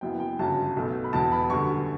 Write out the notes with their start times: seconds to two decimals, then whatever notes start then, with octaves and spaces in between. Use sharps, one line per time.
0.01 F#1 F#2 E3 B3 G5
0.20 G5
0.39 G1 F#2 C#3 F#3 A5
0.76 B1 B2 A3
1.04 B5
1.13 E1 E2 B2 A5
1.32 B5
1.50 F#2 D3 G3 C#6